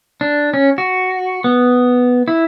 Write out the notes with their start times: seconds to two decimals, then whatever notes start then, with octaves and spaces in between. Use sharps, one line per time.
0.21 D4
0.54 C#4
0.78 F#4
1.44 B3
2.28 E4